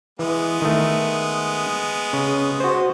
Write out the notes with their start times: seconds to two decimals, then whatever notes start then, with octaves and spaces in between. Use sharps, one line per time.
0.19 E3 G#3 B3
0.62 D#3 A3
2.13 C#3
2.60 F#4 C5